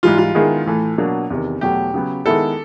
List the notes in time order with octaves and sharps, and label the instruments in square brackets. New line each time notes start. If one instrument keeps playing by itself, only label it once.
[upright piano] G#2 E3 G3 [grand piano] F4
[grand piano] F4
[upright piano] D#3 G#3 B3 E4 G#4
A2 E3 A3
B2 F#3 A#3 D4
E2 C3 D#3
[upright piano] E2 B2 F#3 A3 [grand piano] G4
[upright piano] C#3 F#3 B3
[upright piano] D#3 G#3 B3 E4 [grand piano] A4